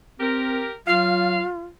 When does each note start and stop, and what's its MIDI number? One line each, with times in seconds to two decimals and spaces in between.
0.20 0.65 60
0.20 0.73 67
0.20 0.73 70
0.86 1.43 54
0.86 1.60 65
0.86 1.42 77